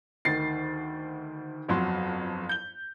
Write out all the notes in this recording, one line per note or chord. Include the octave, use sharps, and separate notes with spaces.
D2 D#3 A6 C7
G1 F2 F#3 C6
G6 G7